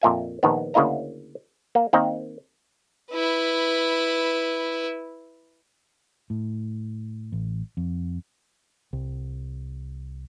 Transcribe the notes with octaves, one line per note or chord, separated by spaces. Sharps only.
F2 A#2 E5 G#5
A#1 D#3 B3
D2 C#3 A#3 E4 D#5 A#5
A#3
D#3 A#3 C4 D#4
E4 B4
A2
A1
F2
C2